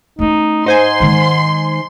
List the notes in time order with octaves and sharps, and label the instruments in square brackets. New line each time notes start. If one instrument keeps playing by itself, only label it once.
[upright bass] A3 C#4 [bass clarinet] D#4
[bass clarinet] G#2 [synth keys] D#4 C5 G#5 [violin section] C6
[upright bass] D#3 G#3